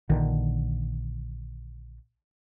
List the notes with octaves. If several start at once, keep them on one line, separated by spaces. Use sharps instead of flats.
A#1 D3 D#3